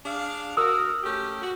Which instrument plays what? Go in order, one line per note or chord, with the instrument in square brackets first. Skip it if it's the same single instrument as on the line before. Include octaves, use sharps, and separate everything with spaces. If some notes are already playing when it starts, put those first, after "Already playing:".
[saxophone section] D4 G#4 F5
[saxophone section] F#4 A#4 [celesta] D#6 E6
[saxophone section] A3 C#4 G4
F#4